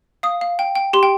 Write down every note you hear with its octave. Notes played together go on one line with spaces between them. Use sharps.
F5 D#6
F5
G5
G5
G4 C6
G5